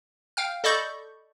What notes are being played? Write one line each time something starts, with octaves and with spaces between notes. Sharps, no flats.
F5 G5 F6
A4 D5 D#5 B5 C#6 G6